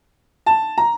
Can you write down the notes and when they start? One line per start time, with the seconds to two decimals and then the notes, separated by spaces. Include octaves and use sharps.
0.46 A5
0.78 A#5